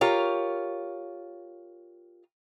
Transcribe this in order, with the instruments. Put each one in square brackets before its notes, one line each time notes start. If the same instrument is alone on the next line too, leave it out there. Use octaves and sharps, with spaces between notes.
[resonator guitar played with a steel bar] F4 G4 A#4 C#5